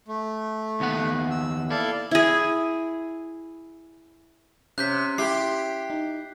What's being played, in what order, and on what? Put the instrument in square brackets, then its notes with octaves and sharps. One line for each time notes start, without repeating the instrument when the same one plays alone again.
[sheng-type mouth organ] A3
[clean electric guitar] D#2 B3 F#5
[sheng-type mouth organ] E6
[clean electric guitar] E4 [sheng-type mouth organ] A4 D5 F5
[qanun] E4 G#4
[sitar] C3 [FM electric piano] C#4 [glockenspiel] F#6 G6 B6
[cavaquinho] E4 C6 [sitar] G4 [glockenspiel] C7
[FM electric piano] D#4